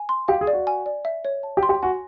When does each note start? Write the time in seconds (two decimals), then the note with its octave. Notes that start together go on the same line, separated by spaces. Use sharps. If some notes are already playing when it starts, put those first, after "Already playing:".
Already playing: G#5
0.09 C6
0.28 G4 F5
0.41 G#4
0.47 D5
0.53 F#4
0.67 G#5
0.86 D5
1.05 E5
1.25 C#5
1.43 A5
1.57 G4
1.63 C6
1.69 G4
1.82 F#4 G#5